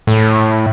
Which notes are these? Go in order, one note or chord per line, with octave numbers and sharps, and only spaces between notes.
A2